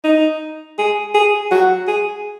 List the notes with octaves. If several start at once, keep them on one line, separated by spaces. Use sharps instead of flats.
D#4
G#4
G#4
F#4
G#4